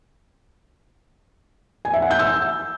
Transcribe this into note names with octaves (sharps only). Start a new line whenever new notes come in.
G#5
E5
F#5
G6
E6